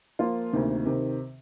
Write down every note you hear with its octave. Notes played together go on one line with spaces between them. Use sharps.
F3 A#3 F4
D2 C3 D#3 A#3
C3 D#3